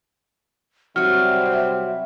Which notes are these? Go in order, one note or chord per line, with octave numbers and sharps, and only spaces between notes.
C3 F#3 G3 C4 F#4 E5 F6